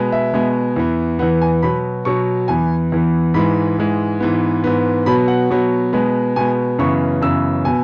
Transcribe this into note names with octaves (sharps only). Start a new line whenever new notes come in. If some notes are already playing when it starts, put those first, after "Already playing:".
Already playing: B2 G#3 B3
E5
B2 G#3 B3
E2 E3 B3
E2 E3 B3 F#5
G#5
B2 F#3 B3 B5
B2 F#3 B3 C#6
E2 E3 B3 G#5
E2 E3 B3
G#2 E3 G#3 B5
G#2 E3 G#3
G#2 E3 B3
G#2 E3 B3
B2 F#3 B3 B5
F#5
B2 F#3 B3
B2 G#3 B3
B2 G#3 B3 G#5
F#2 C#3 E3 B3 C#6
F#2 C#3 E3 B3 E6
B2 B3 G#5